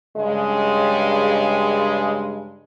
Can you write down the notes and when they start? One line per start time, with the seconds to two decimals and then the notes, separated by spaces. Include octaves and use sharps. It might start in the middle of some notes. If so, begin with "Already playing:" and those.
0.17 G2 C#3 G#3